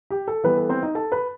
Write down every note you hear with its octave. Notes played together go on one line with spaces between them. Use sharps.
G4
A4
E3 G3 B3 B4
A4
C4 C5
D#4 D#5
A4 A5
B4 B5